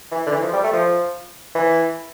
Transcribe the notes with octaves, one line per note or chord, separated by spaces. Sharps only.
E3
D3
E3
F3
G3
A3
F3
E3